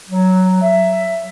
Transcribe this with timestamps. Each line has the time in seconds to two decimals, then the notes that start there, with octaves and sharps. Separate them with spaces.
0.08 F#3
0.62 E5